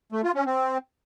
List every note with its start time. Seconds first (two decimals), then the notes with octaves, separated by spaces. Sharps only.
0.12 A3
0.24 F4
0.35 C#4
0.46 C4